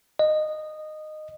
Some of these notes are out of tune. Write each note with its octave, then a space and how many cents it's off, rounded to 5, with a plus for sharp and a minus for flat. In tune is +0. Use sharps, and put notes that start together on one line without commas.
D#5 -15